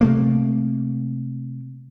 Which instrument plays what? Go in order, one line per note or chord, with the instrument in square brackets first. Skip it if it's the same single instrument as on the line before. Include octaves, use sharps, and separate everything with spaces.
[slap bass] C3 A3 A#3